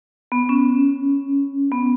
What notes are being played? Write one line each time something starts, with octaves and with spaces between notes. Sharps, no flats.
B3
C#4
B3